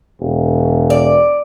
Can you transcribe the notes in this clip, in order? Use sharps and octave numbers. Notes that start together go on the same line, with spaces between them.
E1
D5